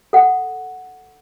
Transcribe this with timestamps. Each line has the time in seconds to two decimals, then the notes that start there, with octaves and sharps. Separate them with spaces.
0.13 A4 F#5